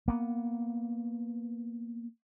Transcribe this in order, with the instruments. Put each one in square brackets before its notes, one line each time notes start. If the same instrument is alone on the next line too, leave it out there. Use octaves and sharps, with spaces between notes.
[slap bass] A#3 B3